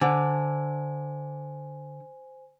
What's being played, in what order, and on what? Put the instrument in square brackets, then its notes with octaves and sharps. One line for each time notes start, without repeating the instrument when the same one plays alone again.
[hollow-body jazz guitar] D3 [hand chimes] C5 G#5